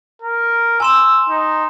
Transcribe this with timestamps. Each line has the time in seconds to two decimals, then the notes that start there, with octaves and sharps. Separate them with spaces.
0.22 A#4
0.80 G#5 C6 E6 E7
1.29 D#4